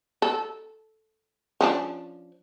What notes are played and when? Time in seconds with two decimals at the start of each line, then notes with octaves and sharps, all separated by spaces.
0.22 A4
1.61 F3 C#4 D4